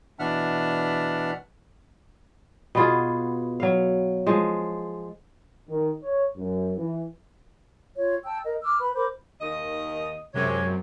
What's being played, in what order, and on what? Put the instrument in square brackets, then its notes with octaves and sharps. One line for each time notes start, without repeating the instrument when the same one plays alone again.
[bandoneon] B2 E3 D4 E5 F#5 F6
[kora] B2 B3 F4 G#4
F#3 F5
F3 G#3
[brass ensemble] D#3
C#5
F#2
E3
[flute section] F4 C#5
G5 A5 E6
A#4 D#5
D6 E6 F6
B4 B5
A#4 C5 B5 D6
[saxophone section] D#2 D#3 D#5
[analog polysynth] F#2 C3 [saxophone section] G#3 G4 C#5